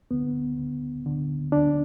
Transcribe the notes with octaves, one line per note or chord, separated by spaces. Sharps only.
D2 D3 B3
D2 D3
D2 D3
D2 D3 D4